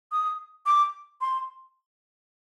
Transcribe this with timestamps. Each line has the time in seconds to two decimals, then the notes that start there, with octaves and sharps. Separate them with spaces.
0.12 D#6
0.66 D6
1.21 C6